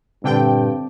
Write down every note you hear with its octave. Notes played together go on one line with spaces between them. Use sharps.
G2 A#2 D3 C4 G5 A5 D6